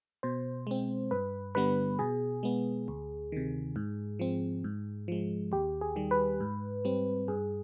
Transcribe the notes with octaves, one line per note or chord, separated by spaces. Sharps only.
B2 C5
G#3 C4
G2 B4
D3 G3 B3 B4
B2 G#4
G#3 B3
D2
C3 D#3
G#2
F3 C4
G#2
F3 G#3
D#2 G4
G#4
D#3 G3
B4
G#2
G3 C4
G2 G#4